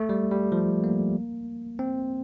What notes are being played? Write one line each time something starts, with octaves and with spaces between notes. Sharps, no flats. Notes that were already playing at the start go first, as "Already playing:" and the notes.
Already playing: A3
G3
G3
F3
A#3
C4